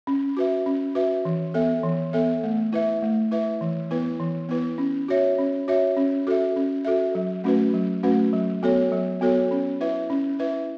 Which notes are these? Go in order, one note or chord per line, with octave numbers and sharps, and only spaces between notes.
C#4
F#4 B4 E5
C#4
F#4 B4 E5
E3
B3 A4 E5
E3
B3 A4 E5
A3
E4 B4 E5
A3
E4 B4 E5
E3
B3 E4 B4
E3
B3 E4 B4
C#4
F#4 C#5 E5
C#4
F#4 C#5 E5
C#4
F#4 A4 E5
C#4
F#4 A4 E5
F#3
A3 C#4 F#4 B4
F#3
A3 C#4 F#4 B4
F#3
B3 F#4 A4 C#5
F#3
B3 F#4 A4 C#5
C#4
E4 B4 E5
C#4
E4 B4 E5